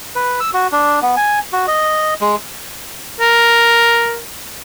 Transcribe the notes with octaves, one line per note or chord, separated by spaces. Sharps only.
B4
E6
F#4
D4
B3
G#5
F#4
D#5
G#3
A#4